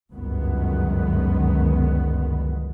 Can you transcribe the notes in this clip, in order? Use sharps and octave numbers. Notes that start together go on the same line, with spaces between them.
G1 C#2 F#2 D#3 B3